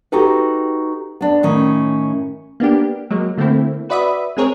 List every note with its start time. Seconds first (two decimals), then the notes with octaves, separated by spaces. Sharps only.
0.12 D#4 F#4 G4 A4 B4
1.21 B3 D4
1.43 A2 D#3 C#4
2.60 A#3 B3 D4 G4
3.11 F#3 G#3 A#3
3.38 D3 A3 A#3 C4 E4
3.89 F#4 B4 D5 E5 B5 D#6
4.37 G#3 C4 G#4 A#4 C#5